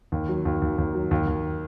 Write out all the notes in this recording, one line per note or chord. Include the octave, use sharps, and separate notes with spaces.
D#2
F#3
D#2
D#2
D#2
F#3
D#2
D#2